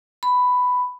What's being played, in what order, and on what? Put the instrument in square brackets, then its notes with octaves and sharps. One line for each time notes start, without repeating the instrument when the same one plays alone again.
[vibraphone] B5